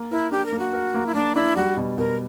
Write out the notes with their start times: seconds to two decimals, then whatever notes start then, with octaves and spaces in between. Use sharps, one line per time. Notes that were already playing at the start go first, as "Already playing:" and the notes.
Already playing: A#3
0.11 E4 A#4
0.31 D4 G4
0.46 A#4
0.52 A#3
0.59 F#4
0.73 A#4
0.94 A#3
1.06 E4
1.14 A#3 D4
1.35 D4 E4
1.56 G3 F#4
1.77 B2
1.98 B2 A#4